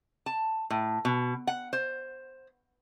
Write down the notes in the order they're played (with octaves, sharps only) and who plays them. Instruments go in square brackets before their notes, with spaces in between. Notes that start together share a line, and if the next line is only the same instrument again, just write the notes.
[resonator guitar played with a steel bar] A5
A2
B2
F#5
C5